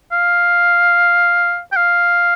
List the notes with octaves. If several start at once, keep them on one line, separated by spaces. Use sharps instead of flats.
F5
G5
F5